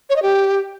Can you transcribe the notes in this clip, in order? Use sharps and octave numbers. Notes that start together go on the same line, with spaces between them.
C#5
D#5
G4